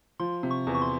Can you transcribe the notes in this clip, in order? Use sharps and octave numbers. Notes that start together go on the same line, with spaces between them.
F3 C6
C3
C#6
E2
C#6
C6